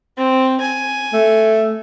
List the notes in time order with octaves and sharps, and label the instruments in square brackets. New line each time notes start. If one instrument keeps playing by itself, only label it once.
[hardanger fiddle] C4
G#5
[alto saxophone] A3